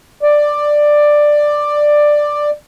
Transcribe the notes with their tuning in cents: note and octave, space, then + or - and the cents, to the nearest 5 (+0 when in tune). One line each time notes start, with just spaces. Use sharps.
D5 +10